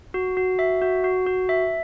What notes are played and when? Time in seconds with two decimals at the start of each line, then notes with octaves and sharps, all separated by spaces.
0.14 F#4
0.37 F#4
0.59 E5
0.81 F#4
1.04 F#4
1.26 F#4
1.49 E5